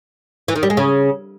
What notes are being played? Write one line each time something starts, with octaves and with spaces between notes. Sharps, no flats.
E3
D#3
G3
G#3
C#3